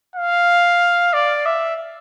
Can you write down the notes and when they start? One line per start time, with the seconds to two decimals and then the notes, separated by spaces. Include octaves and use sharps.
0.16 F5
1.13 D5
1.46 E5